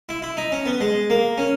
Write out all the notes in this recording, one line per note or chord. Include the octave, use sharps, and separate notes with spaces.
E4
E4
D#4
C#4
B3
G#3
A#3
C#4